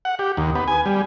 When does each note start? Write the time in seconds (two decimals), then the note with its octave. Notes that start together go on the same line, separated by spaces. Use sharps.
0.05 F#5
0.19 G4
0.37 D#2
0.55 B3
0.68 G#5
0.86 G3